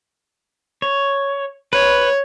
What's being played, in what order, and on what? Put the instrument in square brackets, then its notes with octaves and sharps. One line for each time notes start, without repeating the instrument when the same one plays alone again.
[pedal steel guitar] C#5
[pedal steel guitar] B4 [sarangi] C#5